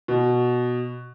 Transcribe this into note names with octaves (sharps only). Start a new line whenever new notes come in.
B2